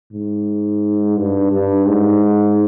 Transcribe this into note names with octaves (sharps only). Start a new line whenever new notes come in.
G#2
G2
G2
G#2